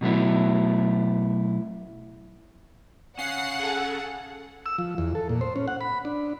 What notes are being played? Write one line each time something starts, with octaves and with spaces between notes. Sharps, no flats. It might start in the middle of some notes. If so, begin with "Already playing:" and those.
B2 F#3 A3 E4
C#4 F5 F#5 C7
G#4 A4
E6
F3
E2
A4
A#2
C5
C#4
F#5
B5
D4